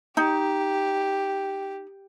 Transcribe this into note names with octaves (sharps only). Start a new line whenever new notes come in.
D#4 G4